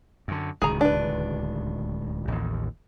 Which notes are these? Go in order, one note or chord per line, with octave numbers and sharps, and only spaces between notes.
F#2 D3
D1 C#2 D#3 G#4 A#5
D4 B4
A1 D#2